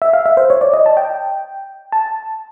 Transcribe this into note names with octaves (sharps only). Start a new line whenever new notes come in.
E5
F5
E5
C5
C#5
D5
D#5
A5
G5
A5